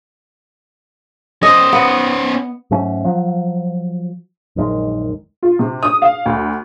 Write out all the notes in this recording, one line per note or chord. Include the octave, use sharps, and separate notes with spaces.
C#4 C5 D#5
B3
G#2 F#3 A3 C#4
F3 F#3
A#1 F#2 D#3 G#3
F4
C3
D#6
F5
D2